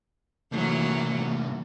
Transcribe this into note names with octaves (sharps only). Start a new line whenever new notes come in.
C2 E3 F#3 A3 A#3